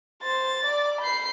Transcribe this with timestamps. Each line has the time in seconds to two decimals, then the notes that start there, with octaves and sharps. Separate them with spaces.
0.23 C5 A6
0.65 D5
1.01 B5 G6 C7